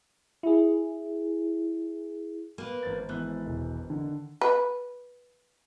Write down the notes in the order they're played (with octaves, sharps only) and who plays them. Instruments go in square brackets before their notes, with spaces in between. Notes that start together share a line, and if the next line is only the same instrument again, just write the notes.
[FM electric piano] E4 G#4
[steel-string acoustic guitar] A#3 B4
[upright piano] G#1 C5 A6
[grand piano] G#2 B3 F#6 [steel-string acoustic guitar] E3
[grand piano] E1
[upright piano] D3 [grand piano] D#3
[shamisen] B4